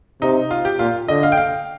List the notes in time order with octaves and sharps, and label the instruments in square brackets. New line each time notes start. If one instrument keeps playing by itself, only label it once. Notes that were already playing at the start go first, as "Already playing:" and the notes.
[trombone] C3 [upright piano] D#4
[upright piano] F4
G4
[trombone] A#2 [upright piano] F4
[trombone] D3 [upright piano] D#5
[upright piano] F5
G5
F5